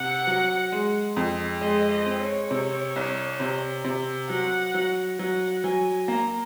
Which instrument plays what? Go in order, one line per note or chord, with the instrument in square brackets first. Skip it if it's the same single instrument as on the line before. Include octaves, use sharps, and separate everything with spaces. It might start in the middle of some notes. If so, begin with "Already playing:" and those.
Already playing: [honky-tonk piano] C3 [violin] F#5
[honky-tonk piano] F#3
G#3
F2
[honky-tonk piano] G#3 [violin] D#5
[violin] D#5
[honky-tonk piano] C4
[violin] C#5
[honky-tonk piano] C3
C2
C3
C3
[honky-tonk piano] F#3 [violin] F#5
[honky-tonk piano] F#3
[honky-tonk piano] F#3 [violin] F#5
[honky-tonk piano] F#3 [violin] G#5
[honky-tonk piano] A#3 [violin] A#5